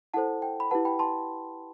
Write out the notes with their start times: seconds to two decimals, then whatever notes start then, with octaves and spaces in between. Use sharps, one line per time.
0.14 E4 A4 C5 F#5 A5
0.42 G5
0.60 B5
0.71 E4 G4 B4 F#5 A5
0.85 G5 B5
0.99 A5 C6